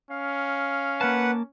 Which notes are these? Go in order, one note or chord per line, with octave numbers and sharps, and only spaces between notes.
C#4 F5
A#3 B4 F#5 A5